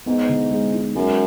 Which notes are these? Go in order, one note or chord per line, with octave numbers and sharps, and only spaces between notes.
G#2 B3
D3
G#3
D#4
F#2 G#3